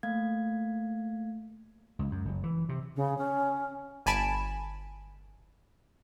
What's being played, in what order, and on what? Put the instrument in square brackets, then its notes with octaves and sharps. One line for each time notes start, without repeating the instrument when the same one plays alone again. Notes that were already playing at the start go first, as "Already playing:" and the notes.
[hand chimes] A3 A#3 F5 G#6
[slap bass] C#2
F#2
F#1
E3
C3
[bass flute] C#3
C#4
[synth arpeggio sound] G1 G#5 A5 B5 D7 E7